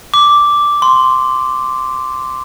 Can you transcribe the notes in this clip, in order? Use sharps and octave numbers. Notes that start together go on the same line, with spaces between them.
D6
C6